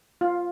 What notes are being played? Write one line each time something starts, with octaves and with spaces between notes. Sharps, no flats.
F4